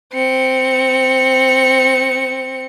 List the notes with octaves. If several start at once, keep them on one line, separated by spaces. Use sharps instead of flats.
C4 C#7